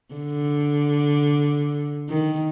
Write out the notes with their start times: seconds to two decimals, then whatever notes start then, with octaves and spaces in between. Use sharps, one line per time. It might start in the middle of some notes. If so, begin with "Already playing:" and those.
0.14 D3
2.09 D#3